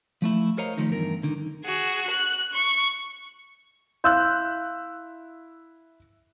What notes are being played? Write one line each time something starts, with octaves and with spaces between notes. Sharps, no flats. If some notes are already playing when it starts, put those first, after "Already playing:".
F3 A3 E4
A#4 C5 C#5 D#5 F5 A#5
D#3 F3 A3 D#4
E2 G2 A#4
D3 D#3
F#4 G#4
F#6
C#6
E4 F5 C6 E6 F#6 G6